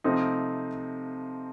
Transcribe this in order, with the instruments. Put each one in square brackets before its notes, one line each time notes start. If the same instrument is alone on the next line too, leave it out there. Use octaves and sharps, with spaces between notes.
[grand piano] C3 F3 A3 C4 D#4